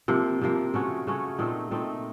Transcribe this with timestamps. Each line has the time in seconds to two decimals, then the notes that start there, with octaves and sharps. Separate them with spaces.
0.08 C3 F3 A#3
0.41 C3 F3 A#3
0.74 C#3 A3 C#4 F#4
1.07 C#3 A3 C#4 F#4
1.38 A#2 A3 C4 D#4
1.71 A#2 A3 C4 D#4